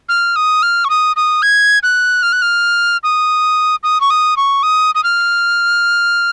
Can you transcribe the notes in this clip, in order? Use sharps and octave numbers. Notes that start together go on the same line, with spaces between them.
F6
D#6
F6
C#6
D#6
D#6
G#6
F#6
F6
F#6
F6
D#6
D#6
C#6
D#6
C#6
D#6
D#6
F6